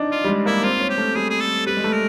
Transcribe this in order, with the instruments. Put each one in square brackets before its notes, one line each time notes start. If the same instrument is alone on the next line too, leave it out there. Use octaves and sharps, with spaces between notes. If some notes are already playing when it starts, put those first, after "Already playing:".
Already playing: [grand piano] D4 D#4
[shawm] F4
[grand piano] G3
G#3
[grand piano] A#3 [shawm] E4
[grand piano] C4 [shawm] F4
[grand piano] C#4
[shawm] G4
[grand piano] A3
[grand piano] G3 [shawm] G#4
[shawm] G#4
A4
[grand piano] G3 [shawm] B4
[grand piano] G#3
A3
[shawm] A#4